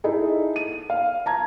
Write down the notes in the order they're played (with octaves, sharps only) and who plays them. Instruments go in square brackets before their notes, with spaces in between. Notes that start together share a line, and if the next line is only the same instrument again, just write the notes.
[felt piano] D#4 E4 G#4 A4
D#7
F5
A5 A#5 G#6